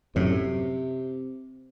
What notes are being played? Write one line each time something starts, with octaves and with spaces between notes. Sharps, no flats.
F#2 A2 C3